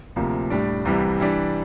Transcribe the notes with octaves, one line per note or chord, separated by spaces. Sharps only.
D2 C3 F3 A#3
A2 G3 D4
C2 C3 E3 G3
E3 G3 D4